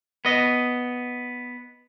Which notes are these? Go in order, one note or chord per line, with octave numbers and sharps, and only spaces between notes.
B3 D#5